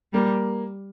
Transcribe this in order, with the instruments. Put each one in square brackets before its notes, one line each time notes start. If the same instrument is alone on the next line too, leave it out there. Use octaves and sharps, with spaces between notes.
[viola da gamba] G3 [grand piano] A#3